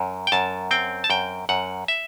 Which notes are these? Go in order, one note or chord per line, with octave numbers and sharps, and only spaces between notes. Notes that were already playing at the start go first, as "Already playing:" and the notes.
Already playing: F#2
G5
F#2 A5
C4 G5
A5
F#2 G5
F#2 F#5
E5